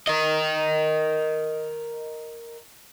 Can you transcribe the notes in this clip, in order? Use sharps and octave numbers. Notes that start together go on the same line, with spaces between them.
A#4 D#5